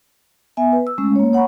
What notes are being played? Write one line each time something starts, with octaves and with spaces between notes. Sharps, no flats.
B3 E5 G#5
B4
E6
G#3 A3 C#4
A#3 C#5
C#5 F#5 A#5 B5 C#6